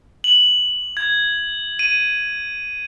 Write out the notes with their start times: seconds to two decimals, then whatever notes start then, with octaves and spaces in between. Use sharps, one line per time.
0.24 F#7
0.97 G#6
1.79 D#7